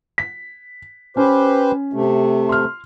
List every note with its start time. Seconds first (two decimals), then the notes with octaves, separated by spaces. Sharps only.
0.18 B6
1.17 C#4 G4 B4 C5
1.93 C3 A3
2.49 C6 F6